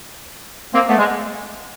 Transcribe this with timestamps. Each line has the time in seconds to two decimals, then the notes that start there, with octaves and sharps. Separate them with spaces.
0.74 A#3 C4
0.88 A3 B3
0.98 G#3